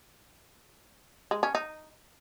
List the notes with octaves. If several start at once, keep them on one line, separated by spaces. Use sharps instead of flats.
G#3
C#4
D#4